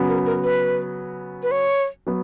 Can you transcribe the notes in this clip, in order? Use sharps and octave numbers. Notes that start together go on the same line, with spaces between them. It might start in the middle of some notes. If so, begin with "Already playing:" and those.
Already playing: C#3 F#3 B3 F#4
A#4
A#4
B4
B4
C#5
F#3 B3